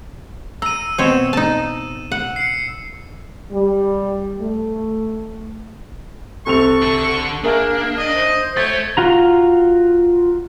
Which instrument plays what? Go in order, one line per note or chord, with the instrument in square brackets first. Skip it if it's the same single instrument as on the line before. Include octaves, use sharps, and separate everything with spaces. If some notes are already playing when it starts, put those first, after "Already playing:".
[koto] A#5 [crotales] E6 D#7
[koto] B2 C4 C#5 [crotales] E6 E7
[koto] D#4 A5
F#5
[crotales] C7 C#7
[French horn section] G3
A3
[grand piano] C2 C4 F7 [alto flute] A4 [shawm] C#6
[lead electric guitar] D3 A5
[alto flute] A#3 [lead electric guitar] D4 [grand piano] G#4 A#4 E5
[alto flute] D5 [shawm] D#5
[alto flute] C5
[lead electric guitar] A4 E5 [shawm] C#5 [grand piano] G6 A6
[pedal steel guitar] F4 F#4 A#5